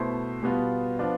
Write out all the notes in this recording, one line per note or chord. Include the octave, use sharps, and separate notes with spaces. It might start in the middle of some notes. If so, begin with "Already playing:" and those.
Already playing: B2 A3 E4 A4 C5
B2 G3 B3 F4
F3 B3 D4 F4